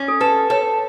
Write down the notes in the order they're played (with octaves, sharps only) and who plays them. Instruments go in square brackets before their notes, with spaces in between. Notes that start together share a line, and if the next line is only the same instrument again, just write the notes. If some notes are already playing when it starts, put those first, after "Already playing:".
Already playing: [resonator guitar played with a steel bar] C#4
[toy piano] A4
[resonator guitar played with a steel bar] A4 [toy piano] B4
[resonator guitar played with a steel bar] A4 [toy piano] C#5